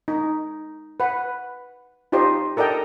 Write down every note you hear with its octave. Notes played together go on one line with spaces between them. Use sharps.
D#4
B4 F#5
D#4 F4 G4 C5 D5 D#5
A4 A#4 D5 D#5 G5 A#5